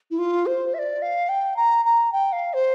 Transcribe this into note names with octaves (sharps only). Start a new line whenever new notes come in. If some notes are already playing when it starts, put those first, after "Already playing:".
E4
F4
C5
E5
D5
F5
G5
A#5
A#5
G5
F5
C5